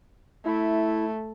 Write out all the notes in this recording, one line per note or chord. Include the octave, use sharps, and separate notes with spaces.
A3 E4